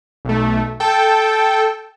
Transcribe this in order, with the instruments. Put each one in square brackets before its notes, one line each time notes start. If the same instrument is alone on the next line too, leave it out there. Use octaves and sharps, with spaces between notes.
[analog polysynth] B1 A3
A4 G5